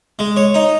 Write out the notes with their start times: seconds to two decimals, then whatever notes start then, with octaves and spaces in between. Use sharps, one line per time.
0.19 G#3
0.36 C#5
0.54 D#4